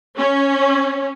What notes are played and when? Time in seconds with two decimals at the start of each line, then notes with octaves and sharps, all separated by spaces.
0.19 C#4